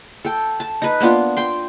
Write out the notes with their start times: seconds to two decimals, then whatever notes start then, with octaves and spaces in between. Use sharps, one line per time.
0.25 A4 G5
0.60 A5
0.82 D#4 B4
1.00 A#3 B3 D4 F4
1.37 G5 C6